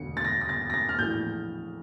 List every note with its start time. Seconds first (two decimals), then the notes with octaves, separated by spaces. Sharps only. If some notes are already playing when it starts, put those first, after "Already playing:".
Already playing: E1 D2 D3 C#7
0.17 A6
0.24 A#6
0.41 A#6
0.49 A6
0.70 A#6
0.74 A6
0.89 F6
0.99 A#1 A2 E3 G6